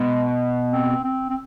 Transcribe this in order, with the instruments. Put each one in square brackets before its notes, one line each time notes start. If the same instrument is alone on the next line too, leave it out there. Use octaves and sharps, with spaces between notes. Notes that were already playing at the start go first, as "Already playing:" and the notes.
Already playing: [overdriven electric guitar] B2 [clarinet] G#3
[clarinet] C4
C4
C4